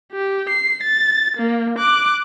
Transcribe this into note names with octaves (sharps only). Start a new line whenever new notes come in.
G4
C7
A6
A#3
D6 F#6